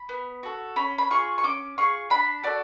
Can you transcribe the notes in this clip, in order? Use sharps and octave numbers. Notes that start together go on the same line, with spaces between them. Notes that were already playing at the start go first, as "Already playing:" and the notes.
Already playing: B5
B3
F#4 A4
C#4 B5
B5
F4 G#4 C#6
C#6
C#4 D6
F4 G#4 C#6
D4 B5
F#4 A4 D5